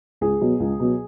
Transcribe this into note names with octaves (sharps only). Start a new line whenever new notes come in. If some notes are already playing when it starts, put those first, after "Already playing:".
C#2 G#4
B2 F#3
C#2
B2 F#3